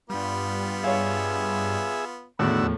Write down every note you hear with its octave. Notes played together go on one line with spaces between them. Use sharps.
G2 G3 B3 F4
G#4 C#5 E5 F5
E2 A2 D3 D#3 A3 F#4 B5 E6
D#2 F3